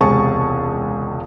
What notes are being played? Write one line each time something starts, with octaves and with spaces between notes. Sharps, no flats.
E1 C#2 C3 G#4 A5 C#6